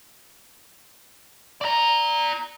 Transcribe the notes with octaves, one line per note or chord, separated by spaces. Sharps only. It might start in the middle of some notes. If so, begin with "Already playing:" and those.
D5 A#5